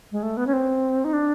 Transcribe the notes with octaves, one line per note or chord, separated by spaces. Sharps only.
G#3
A3
B3
C#4
C4
D#4
D4